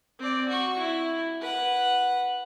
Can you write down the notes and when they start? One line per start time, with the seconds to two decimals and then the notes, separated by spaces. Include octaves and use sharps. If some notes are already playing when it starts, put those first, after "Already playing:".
0.19 C4 D5
0.49 F#4 C#6
0.79 E4
1.41 B4 F#5